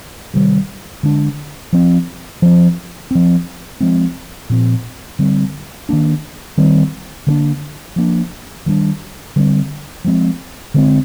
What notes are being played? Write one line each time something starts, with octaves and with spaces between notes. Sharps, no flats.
C3 D#3 G3
D3 G#3 D4
F3 C4
F3 C4
F3 C4
F3 G#3 C4
A#2 F3 C4
D3 G3 C4
D#3 A#3 D4
D#3 G3 C4
D3 F3 A#3 D4
F3 A#3 D4
D#3 G3 A#3 D4
D3 G3 C4
F3 G#3 C4
D3 G#3 C4